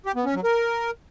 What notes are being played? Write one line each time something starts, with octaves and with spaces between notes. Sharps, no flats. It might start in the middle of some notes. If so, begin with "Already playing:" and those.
G4
B3
C#4
F#3
A#4